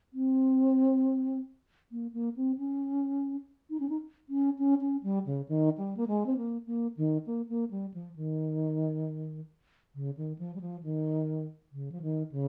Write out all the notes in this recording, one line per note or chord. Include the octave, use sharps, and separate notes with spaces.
C4
A#3
A#3
C4
C#4
D#4
C#4
D#4
C#4
C#4
C#4
G3
C#3
D#3
G3
A#3
G#3
C4
A#3
A#3
D#3
A#3
A#3
G3
F3
D#3
C#3
D#3
F3
G3
F3
D#3
C#3
F3
D#3
C#3